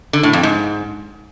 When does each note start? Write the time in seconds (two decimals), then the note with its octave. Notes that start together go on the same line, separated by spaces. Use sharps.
0.13 D3
0.23 A2
0.33 F2
0.43 G#2